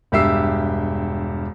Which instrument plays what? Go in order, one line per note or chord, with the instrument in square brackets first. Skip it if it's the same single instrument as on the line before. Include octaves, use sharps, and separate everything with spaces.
[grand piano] E1 G2 G4 E5 E6 C7